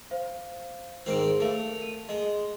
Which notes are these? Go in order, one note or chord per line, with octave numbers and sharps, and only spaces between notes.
C5 F5
G#2 D#3 C4 G#4 D7
A3 A#4 F5 F7
D#7
G#3 D#5